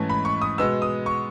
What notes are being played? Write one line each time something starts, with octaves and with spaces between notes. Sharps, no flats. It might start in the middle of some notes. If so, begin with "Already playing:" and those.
Already playing: G#2 E3 A3 C#4 A5
B5
C#6
D#6
B2 G#3 B3 E6
D#6
C#6